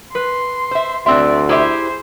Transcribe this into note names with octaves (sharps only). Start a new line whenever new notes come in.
B4 C6
C5 E5
D2 C4 D5 E5 C6 F#6
E4 G4 G#4 C5 E5